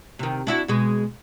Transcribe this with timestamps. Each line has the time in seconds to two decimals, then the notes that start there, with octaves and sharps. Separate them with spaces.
0.19 C3 D#3
0.47 D4 E4 F#4
0.68 B2 G#3